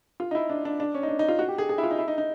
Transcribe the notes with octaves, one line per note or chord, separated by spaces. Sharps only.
F4
D#4
E4
D4
D4
D4
C#4
D#4
D4
D#4
F4
F#4
G4
G#4
G#4
E4
F4
D#4
E4
D#4
D#4